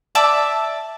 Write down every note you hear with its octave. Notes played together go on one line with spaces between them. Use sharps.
D5 E5 A5 D6